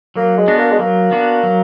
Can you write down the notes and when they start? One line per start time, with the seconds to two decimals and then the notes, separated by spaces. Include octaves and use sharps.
0.16 F#3 A#3
0.37 G#3
0.48 B3 D4 F#4
0.58 A#3
0.71 G#3
0.79 F#3 A#3
1.11 B3 D4 F#4
1.43 F#3